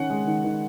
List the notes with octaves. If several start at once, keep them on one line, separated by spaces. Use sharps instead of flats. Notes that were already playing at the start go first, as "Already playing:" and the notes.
Already playing: D#3 C#4 F#5
G#3
D#3
D#3